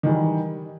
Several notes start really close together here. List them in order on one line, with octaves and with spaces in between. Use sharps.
D#3 E3 G3